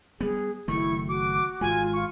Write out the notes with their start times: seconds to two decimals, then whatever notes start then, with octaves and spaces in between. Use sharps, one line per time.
0.21 G3 B3 G#4
0.68 F#1 D#3 A3 E4 C#6
1.08 F#4 D6
1.61 G#1 G#3 F4 G#5
1.93 F4 C#6